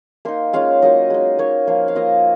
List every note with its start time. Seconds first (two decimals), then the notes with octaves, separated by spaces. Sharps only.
0.25 A#3 D#4 C6
0.53 G#3 C#4 F4 F5
0.82 F#3 A#3 D#4 D#5
1.10 G#3 D#4
1.38 A#3 D#4 C#5
1.67 F3 A#3 F4
1.88 F5
1.95 A#3 F4 D#5